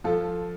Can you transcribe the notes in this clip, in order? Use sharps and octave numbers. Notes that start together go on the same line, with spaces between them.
F3 F4 A4